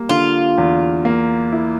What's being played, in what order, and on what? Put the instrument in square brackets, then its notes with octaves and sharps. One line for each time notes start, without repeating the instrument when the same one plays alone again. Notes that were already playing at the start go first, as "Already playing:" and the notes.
Already playing: [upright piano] G3 A#3
[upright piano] D3 [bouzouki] F4
[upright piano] E2
A#3
E4